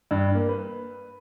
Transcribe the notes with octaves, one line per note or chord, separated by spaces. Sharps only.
G2
A#3
B4